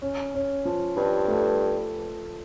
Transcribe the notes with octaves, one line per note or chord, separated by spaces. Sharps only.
C#4
C#4
F3
G2 F3
A3